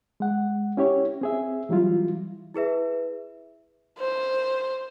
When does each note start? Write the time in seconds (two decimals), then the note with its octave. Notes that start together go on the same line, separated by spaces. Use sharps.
0.20 G#3 F#5
0.77 C#4 E4 G4 C#5
1.21 C4 G#4 E5
1.69 E3 F#3 G3 E4 F4
2.54 E4 G#4 B4 E5
3.99 C5